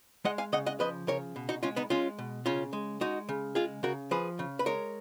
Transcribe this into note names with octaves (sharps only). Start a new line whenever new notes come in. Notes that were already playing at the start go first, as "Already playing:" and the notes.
G#3 D#5 F#5
F5 G#5
C#3 D#5 F#5
D#5 F#5
F3 B4 D#5
C#3 A#4 C#5
B2
D#4 F#4
G#3 C#4 F4
B3 D#4
G#3 C#4 F4
B2
C#3 C#4 F4
G#3
G#3 D#4 F#4
C#3
G#3 F4 G#4
C#3 F#4 A#4
F3 G#4 B4
C#3
B4
G#3 A#4 C#5